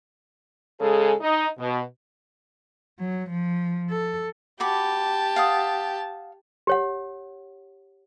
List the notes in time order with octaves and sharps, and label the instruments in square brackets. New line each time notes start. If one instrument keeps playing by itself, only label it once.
[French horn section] C#3 G#3 G#4 A4
D#4
B2
[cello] F#3
F3
A4
[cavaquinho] F#4 B5 D6 [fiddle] G4 A5
[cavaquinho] F5 F#5 D#6
[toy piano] G4 C#5 F#5